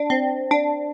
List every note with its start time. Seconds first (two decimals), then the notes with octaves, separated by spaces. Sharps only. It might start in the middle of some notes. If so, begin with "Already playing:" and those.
Already playing: D4
0.10 C4
0.51 D4